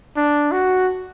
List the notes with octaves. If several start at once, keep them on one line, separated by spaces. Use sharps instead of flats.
D4
F#4